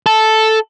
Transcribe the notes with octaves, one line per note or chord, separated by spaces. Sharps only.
A4